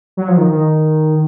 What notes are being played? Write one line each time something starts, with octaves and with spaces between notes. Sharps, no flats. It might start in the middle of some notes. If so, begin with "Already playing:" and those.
F#3
F3
D#3
D#3